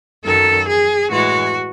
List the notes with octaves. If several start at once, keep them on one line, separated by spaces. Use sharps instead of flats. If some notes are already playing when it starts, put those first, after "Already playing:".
F#2 D#3 F#3 A4
G#4
A2 E3 G#3 F#4